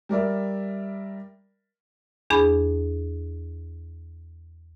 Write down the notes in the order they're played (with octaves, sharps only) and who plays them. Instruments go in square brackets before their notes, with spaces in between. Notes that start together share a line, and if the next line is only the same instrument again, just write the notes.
[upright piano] G3 A#4 D5 E5
[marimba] E2 D4 G#4 B5